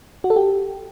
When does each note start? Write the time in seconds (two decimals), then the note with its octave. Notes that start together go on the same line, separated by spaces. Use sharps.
0.24 F#4
0.30 A4
0.36 G4